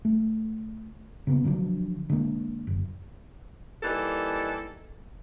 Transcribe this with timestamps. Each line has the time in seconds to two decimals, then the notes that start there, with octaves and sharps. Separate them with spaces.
0.05 A3
1.27 C#3 A#3 B3
1.44 D3 F3 F#3 D4
2.10 D3 G#3 A#3
2.67 F#1
3.83 E3 G3 A#3 D#4 A4